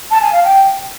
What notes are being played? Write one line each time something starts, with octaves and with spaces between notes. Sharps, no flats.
A5
G#5
F5
G5